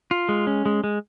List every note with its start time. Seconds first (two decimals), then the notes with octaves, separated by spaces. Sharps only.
0.11 F4
0.29 G#3
0.47 C#4
0.66 G#3
0.84 G#3